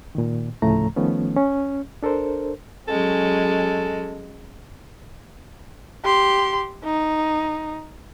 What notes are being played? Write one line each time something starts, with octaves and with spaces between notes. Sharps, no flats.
A#2 D#3
D2 A2 C#3 F3 A3 A#5
D#3 F3 A3 B3 C#4
C#4
D4 A4 A#4 C5
F#3 G#3 C#4 A4
G4 C6
D#4